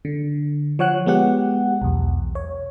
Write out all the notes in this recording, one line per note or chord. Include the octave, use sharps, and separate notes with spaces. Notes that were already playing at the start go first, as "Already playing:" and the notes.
D3
F3 C#5 F#5 F#6
G#3 B3 G4 F#5
B1 E2
C#5